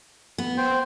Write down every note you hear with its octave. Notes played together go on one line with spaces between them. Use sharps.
B3
C5 G5